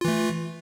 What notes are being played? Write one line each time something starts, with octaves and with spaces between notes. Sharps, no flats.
E3 A3 F4